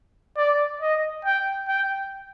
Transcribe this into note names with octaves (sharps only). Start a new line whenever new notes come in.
D5
D#5
G5
G5